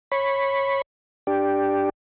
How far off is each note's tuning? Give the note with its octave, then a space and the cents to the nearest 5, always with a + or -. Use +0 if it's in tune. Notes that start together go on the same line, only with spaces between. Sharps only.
C#5 -15 B5 +0
D4 +0 G4 +0